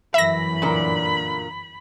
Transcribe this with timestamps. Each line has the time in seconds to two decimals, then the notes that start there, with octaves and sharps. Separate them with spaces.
0.14 G1 F#2 E3 E5 B5 A#6
0.62 A#2 D3 A#4